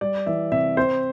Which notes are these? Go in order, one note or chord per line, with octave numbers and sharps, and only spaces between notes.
G3 D5
E3 E5
C3 E5
C4 C5